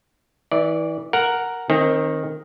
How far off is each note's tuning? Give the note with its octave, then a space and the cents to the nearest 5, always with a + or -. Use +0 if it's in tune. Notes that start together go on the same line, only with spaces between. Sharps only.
E3 -30 D5 +0
A#4 +0 F#5 +0
D#3 +0 C4 +25